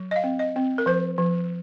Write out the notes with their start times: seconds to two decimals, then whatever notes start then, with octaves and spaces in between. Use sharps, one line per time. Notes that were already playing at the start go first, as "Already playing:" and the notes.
Already playing: F#3
0.11 D#5
0.16 F5
0.24 C4
0.39 D#5
0.56 C4
0.78 A#4
0.86 F3 C5
1.18 F3